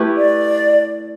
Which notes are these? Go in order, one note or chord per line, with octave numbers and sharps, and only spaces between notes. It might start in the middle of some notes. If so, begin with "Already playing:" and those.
Already playing: A3 E4 G4 B4
D5